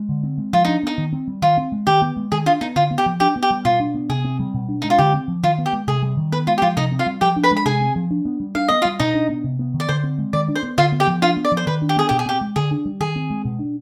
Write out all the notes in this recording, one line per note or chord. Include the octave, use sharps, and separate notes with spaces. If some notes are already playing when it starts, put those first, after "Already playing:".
Already playing: G#3
D3
C4
G#3
F3 F4
D4 D#4
B3 D#4
D#3
C4
G3
D#3 F4
C4
G#3
D#3 G4
B3
G#3
D#3 G#4
D4 F4
B3 D#4
D3 F4
B3
G4
F3
D4 G4
B3
G4
G3
B2 F4
D4
B3
C3 G#4
C4
G3
B2
D4
G#3 D#4
F4
D3 G4
C4
F3
D#3 F4
B3
G4
G#3
C3 G#4
G3
D#3
B3 B4
G#3 F4
G4
F3 F4
C3 D#4 D#5
C4
F4 F5
G3
F3 G4 G5
D4
B4 B5
G#3
B5
C3 G#4 G#5
C4
F3
D4
B3
G3
D4 F5
B3 D#5
F4 F5
G3
B2 D#4 D#5
D4
B3
C3
B3
D#3
D5
D3 C5
C4
G#3
D#3 D5
D4
C5
B3
D3 F4 F5
B3
G4 G5
F3
D4 F4 F5
B3
D5
F3
C5
D#3 B4
D4
G4
B3 G#4
B2 G4
G#4
C4 G4
G#3
D3 G#4
D4
G3
D#3 G#4
C4
G#3
B2
D4